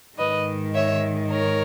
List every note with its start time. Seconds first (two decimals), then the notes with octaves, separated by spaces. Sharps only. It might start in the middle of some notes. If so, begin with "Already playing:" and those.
0.18 G#2 D#3 B4 D#5
0.74 C#5 E5
1.31 A#4 C#5